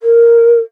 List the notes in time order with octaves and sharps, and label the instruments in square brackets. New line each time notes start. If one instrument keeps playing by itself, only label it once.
[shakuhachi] A#4